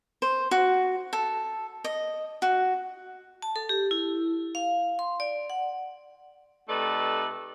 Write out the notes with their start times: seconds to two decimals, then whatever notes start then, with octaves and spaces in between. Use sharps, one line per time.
0.22 C5
0.51 F#4
1.13 A4
1.84 D#5
2.42 F#4
3.42 A5
3.56 A4
3.69 G4
3.91 E4
4.55 F5
4.99 C6
5.20 D5
5.50 F#5
6.69 C3 A3 D#4 A4 B4 D5